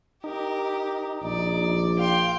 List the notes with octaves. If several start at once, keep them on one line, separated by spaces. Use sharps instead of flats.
D#4 G4 A#4
A#1 D5
F5 G5 C6